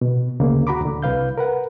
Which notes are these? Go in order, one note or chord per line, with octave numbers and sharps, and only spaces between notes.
B2
D2 C#3 A#3
F#4 A#5 B5 D6
D2 D3
C2 B4 F5 G6
A#4 B4 F#5